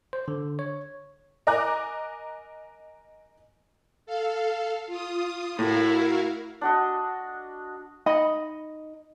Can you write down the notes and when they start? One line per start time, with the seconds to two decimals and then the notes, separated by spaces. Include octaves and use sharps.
0.13 C5
0.28 D3
0.59 C#5
1.47 A#4 D#5 G#5 A#5 D6 F#6
4.06 A4 F5
4.87 F4 D#6
5.59 A2 E4 F#4 A#4 F5
6.61 D4 F#4 D#5
8.06 D#4 D#5 B5